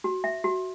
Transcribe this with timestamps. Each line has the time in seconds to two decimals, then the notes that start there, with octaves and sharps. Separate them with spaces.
0.04 F#4
0.24 E5
0.44 F#4